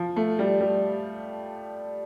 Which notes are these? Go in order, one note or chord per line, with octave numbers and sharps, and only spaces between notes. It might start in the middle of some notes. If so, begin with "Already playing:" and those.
Already playing: F3
A3
G3
G3